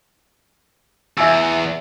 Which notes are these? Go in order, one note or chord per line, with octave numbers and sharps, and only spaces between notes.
E2 E5 G#5 E6